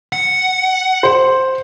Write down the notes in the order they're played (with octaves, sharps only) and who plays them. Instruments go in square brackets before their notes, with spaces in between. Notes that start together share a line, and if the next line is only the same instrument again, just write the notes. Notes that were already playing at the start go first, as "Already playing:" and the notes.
[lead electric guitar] F#5
[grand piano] C5